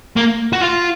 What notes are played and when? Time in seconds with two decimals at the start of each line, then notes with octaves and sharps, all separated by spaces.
0.17 A#3
0.53 F#4
0.60 F4